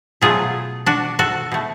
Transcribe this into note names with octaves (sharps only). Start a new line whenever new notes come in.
B2 F#3 A3 F4 G#4
D4 F#4
F#4 A4
B2 A3